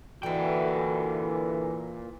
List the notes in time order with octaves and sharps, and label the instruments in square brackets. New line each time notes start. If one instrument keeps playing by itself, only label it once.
[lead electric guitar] A#2 G5 [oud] D3 D#4 [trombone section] E3 [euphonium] F#4